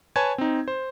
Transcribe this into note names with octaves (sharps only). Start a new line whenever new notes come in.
B4 C#5 G#5 A5 G#6
C4 D#4
C5